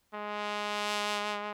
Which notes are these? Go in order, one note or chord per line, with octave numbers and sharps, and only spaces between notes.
G#3